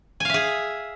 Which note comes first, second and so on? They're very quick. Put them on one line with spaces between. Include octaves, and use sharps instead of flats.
G#5 F5 E5 G#4